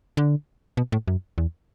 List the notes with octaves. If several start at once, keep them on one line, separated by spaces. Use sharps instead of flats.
D3
B2
A2
F#2
E2